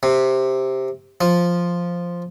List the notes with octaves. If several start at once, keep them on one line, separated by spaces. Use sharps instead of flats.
C3
F3